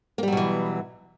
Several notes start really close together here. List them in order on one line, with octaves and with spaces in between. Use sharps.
A#3 G3 F#3 B2 E3